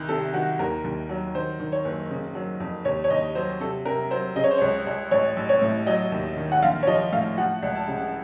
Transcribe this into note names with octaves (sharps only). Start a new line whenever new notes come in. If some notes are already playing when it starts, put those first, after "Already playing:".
Already playing: C2 D#3
C3 A4
D#3 F#4
D#2 A#4
D#2
F#3
D#3 C5
D#3
C#5
F#1
C#3
F#3
F2
D#2 C#5
C#5
D#2 D#5
F#3 C5
C3 A4
C3 A#4
F#3 C5
C#3 D#5
C#5
C5
C#2 C#5
C#2
A1 C#5
A1
C#5
A2
F#3 D#5
D#2
D#3
F#5
A#1 F5
C#5
F3 D#5
A2 F5
F3 F#5
C#2
A5
C#3